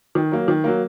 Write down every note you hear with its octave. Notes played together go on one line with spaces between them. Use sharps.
D#3
F#3 A#3
D#3
F#3 A#3